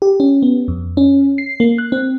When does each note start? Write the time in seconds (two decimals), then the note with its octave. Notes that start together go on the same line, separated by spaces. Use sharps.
0.02 G4
0.20 C#4
0.43 B3
0.68 F2
0.97 C#4
1.38 C7
1.60 A#3
1.78 F#6
1.92 C4